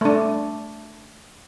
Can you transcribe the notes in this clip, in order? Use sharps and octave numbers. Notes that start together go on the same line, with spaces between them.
A3 D4